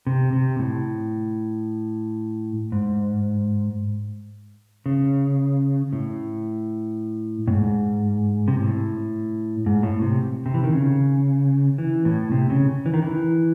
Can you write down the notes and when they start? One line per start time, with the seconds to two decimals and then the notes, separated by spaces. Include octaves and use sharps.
0.07 C3
0.33 C3
0.59 A2
2.72 G#2
4.86 C#3
5.93 A2
7.47 A2
7.53 G#2
8.48 C3
8.59 A2
9.66 G#2
9.83 A2
10.02 C3
10.46 C3
10.54 E3
10.64 D#3
10.72 C#3
11.78 E3
12.05 A2
12.32 C3
12.50 C#3
12.86 E3
12.94 D#3
13.02 E3